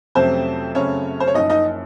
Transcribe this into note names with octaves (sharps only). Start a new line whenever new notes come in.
F2 C3 F#3 A3 C4 C#4 C5
F#2 C#3 F#3 A3 C4 C#4 C#5
C5
C#5
F#1 F#2 F3 D#4 D#5
D#4 D#5